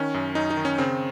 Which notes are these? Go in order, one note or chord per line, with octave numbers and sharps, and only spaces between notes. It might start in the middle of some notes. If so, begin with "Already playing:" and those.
Already playing: D#3 C#4
F#2
F#2 D#4
D#4
D#3
C#4
C#3 C4